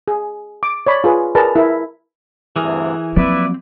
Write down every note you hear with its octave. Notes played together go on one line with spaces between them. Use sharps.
G#4
D6
C#5 D5 B5
F4 G#4 B4
G#4 A#4 B4 D5 A5 A#5
E4 A#4 E5
D2 G2 C3 E3 G#4 A#4
F3 F#3 A#3 C4 E4 B4 D5 E5